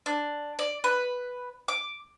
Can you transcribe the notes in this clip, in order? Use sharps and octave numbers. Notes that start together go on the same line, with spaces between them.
D4
D5
B4
D6